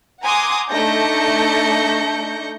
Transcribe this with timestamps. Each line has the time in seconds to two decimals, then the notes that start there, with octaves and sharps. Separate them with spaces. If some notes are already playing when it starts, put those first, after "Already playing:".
0.22 F#5 G#5 A#5 C6 D6 D#6
0.70 A3 D4 D#4 G6 A#6 C#7